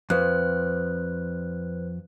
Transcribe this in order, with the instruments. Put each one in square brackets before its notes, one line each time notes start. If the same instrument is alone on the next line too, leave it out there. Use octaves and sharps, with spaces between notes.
[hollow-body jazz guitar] F2 [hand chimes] B4 C5 F#6